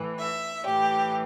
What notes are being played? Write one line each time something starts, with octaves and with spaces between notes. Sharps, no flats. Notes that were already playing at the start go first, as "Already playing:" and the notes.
Already playing: A2 E3
E5
A2 E3 G4